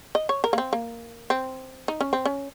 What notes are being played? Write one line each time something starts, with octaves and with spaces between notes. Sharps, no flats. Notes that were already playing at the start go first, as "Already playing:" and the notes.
D#5
C#5
A#4
A#3
C4
A#3
C4
D#4
C#4
C4
C#4